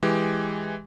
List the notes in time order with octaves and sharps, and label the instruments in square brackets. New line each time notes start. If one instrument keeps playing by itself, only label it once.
[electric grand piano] E3 G#3 G4